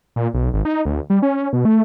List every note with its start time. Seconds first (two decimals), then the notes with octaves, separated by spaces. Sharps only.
0.16 A#2
0.34 B1
0.54 G#1
0.65 D#4
0.86 D2
1.10 G3
1.22 C#4
1.53 B2
1.65 A3